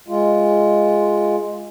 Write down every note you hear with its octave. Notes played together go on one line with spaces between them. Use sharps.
G#3 F4